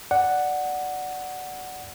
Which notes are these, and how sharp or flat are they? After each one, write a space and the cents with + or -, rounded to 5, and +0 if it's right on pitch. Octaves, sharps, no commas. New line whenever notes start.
D5 +0 F#5 +0